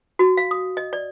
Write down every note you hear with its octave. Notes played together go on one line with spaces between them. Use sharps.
F#4
F5
D#6
D#5
D5